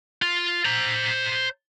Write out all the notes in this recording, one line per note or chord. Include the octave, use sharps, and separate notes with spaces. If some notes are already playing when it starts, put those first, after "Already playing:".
F4
C5 A#5